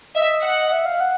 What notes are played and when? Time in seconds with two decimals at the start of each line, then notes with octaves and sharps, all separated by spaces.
0.15 D#5 E5
0.44 F#5
0.72 E5
0.86 F5
1.00 F#5